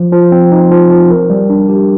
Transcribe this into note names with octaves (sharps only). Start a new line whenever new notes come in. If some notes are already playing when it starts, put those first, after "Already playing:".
Already playing: F3
F3
C4
D#4
F3
F3
A#4
G3
D4
G4